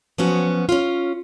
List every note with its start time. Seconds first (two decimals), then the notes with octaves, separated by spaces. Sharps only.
0.18 F3 F#3 B3 C#4 F#4
0.69 C#4 F4